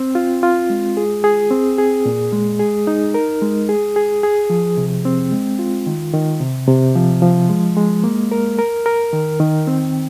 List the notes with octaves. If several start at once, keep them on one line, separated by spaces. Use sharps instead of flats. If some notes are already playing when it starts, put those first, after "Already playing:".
Already playing: C4
F4
F4
G#3
G#4
G#4
C4
G#4
A#2
G#3
G#4
D#4
A#4
G#3
G#4
G#4
G#4
F3
C3
C4
G#3
F4
D#3
D#3
C3
C3
F3
F3
G#3
G#3
A#3
A#4
A#4
A#4
D#3
D#3
C4